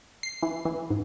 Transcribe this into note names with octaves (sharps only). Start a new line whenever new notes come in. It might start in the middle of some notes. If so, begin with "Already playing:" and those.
C7
E3
E3
G#2